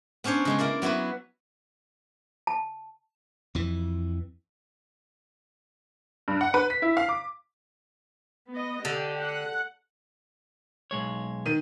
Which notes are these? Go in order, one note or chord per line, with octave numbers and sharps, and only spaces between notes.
B3 C#4 D4 C5 C#5
C#3 G#3 C6
A#3 E4 A#4 D5
F#3 B3 E4 F#4 B4
A5
F2 E3
G2
F#5
B4
B6
E4
F5
D6
B3 D#5
D3 G4
F#5
B1 G#3 C#5
D#3 D#7